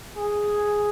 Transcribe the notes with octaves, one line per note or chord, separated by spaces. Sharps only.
G#4